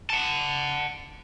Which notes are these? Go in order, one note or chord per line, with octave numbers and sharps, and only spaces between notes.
F#5 A5